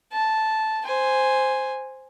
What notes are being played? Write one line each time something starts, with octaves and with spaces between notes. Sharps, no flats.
A5
C5 G#5